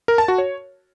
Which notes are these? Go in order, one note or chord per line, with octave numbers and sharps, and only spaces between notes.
A#4
A5
F#4
C#5